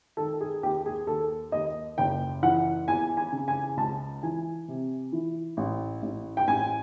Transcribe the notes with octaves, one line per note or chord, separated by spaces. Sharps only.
D#3 A4
G#4
D#2 G4
G#4
D#2 A4
D#2 D#5
F#1 G5
E3 F#5
E2 G#5
G#5
C#3
G#5
C#2 A5
E3 G#5
C3
E3
A1
A1
G5
A1 G#5